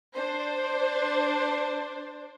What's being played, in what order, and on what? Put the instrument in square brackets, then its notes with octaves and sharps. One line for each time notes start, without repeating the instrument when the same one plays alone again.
[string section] D4 C5